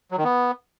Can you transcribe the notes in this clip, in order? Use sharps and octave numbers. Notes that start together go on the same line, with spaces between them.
F#3
D#3
B3